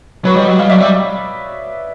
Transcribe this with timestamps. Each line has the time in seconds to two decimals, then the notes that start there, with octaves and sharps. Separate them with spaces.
0.25 F#3 B4 C#5
0.36 G3 C#5 D#5
0.48 F#3
0.59 G3 D#5 F5
0.69 F#3 D5 E5
0.81 G3 D5 E5